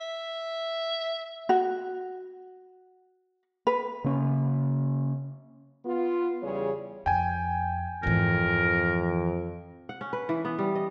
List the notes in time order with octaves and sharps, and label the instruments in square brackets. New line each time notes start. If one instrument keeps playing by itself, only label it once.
[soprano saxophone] E5
[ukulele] F#4
B4
[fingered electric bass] C#3 A#3 C#4
[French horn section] B3 F4
E2 C#3 G3 G#4 C#5
[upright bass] F2 [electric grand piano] G5 G#5
[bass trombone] F2 [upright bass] G#2 E3 [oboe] A#4
[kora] F#5
C#4
B4
E3
B3
G3
D#5